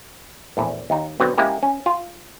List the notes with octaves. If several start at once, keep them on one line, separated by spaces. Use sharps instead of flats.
A#1 E2 A2
D#2 D#4
B2 D3 F#3 B3 C4
G#3 A#3 C#4 E4 G4 A#4
C#4
F4